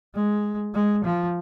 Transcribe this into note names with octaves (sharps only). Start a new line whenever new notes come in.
G#3
G#3
F3